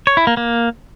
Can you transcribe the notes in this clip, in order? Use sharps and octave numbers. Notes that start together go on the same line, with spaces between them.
C#5
E4
A#3
A#3